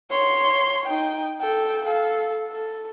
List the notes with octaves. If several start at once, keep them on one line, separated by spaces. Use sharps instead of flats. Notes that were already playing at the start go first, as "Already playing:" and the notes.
C#5 C6
D#4 G5
A4 G5
A4 F5
A4